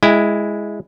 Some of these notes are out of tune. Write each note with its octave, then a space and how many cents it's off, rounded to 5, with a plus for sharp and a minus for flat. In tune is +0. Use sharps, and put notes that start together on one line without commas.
G#3 +0 E4 +5 G5 +45